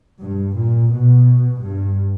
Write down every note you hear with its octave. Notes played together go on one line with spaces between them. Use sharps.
G2
A#2
B2
G2